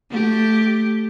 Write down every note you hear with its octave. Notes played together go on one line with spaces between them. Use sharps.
A3 G4